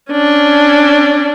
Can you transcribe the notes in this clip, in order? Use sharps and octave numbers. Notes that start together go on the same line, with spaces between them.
C#4 D4